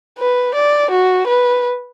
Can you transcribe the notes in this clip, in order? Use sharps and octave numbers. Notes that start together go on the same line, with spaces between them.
B4
D5
F#4
B4